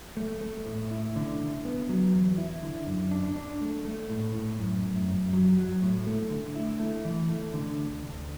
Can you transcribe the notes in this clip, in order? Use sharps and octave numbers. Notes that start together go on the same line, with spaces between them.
A3
A3
A2
E4
D3
D3
B3
F#3
E2
E4
D3
F#2
D4
D4
A3
A3
A2
A2
F#2
F#2
F#2
F#3
F#3
A2
A3
D3
E4
A3
E3
A3
D3
D2
D2